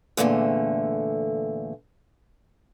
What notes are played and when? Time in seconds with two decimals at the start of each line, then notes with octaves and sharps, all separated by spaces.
0.17 E2 A#2 D3 G#3 A3